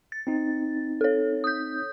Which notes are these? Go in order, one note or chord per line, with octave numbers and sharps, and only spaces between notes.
A6
C4 D#4
A4 C#5
D#6 G6